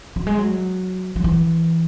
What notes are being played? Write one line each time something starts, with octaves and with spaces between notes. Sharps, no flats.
F#3
G#3
F#3
F#3
E3